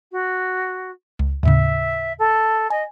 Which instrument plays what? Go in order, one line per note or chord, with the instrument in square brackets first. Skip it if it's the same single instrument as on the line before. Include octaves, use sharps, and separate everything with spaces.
[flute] F#4
[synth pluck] C#2
[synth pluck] D#2 A2 C#3 [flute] E5
[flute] A4
[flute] D#5 [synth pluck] G#5